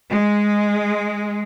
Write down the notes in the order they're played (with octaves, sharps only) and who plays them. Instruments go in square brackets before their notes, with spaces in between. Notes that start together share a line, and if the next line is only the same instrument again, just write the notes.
[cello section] G#3